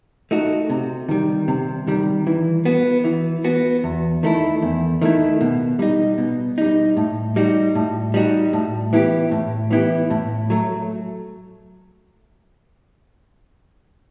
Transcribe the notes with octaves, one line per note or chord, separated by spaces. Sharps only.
A3 D#4 F#4
C3
D#3 G3
C3
D#3 G3
E3
B3 F#4
E3
B3 F#4
E2
D#3 A3 E4
E2
D#3 A3 E4
B2
G3 D#4
B2
G3 D#4
A2
G3 D#4 F#4
A2
G3 D#4 F#4
A2
E3 B3 E4 G4
A2
E3 B3 E4 G4
A2
F#3 A3